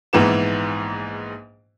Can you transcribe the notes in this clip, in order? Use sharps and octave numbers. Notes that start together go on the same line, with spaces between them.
A#1 G#2 E3 B3 E7